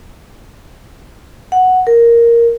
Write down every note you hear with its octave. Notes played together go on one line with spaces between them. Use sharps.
F#5
A#4